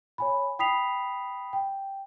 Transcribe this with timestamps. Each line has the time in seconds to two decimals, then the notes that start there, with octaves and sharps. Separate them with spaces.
0.18 C#5 G#5 B5
0.59 G5 B5 D#6 B6 C7 F7
1.53 G5